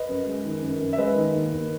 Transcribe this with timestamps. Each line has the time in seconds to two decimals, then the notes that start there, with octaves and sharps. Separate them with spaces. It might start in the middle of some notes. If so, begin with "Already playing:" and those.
Already playing: B4 D#5
0.09 F#2
0.27 G#3
0.45 D#3
0.62 F#2
0.81 F#2
0.93 E5
0.98 G#3 B4 D#5
1.16 D#3
1.35 D#2
1.53 D#2